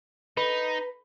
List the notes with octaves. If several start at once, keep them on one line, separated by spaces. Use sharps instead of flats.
D#4 B4